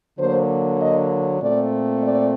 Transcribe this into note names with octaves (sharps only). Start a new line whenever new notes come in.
D3 F#3 A#3 C5
D#5
A#2 A3 C4 D5
D5